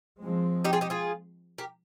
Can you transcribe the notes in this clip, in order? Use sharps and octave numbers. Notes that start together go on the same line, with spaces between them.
F3 G#3 C4
D#4 G4
F4 G#4
D#4 G4
F4 G#4
G4 A#4